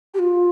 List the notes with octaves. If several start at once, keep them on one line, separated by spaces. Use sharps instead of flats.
G4
F4